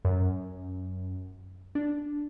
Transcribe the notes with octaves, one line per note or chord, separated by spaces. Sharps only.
F#2
D4